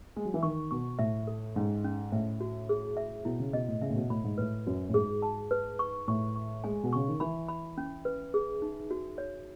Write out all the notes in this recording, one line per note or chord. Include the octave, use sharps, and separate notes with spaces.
G#3
F#3
E3
D#3 C#6
B2 C#6
A2 E5
A4
G#2 C#4
C#4
A2 E5
F#4
G#4
E5
B2 E4
C#3
B2 D#5
A2
C#3 E5
A2
B2
A2 B5
G#2
A2 B4
F#2 F#4
A2
G#2 G#4
A5
B4
C#6
A2 C#6
C#6
G#3 G#5
B2
C#3 C#6
D#3
E3 B5
B5
C#4
B4
G#4
D#4
F#4
C#5